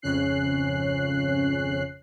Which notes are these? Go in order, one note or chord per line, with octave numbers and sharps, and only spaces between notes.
G#1 F2 C#3 C#4 F#6 C7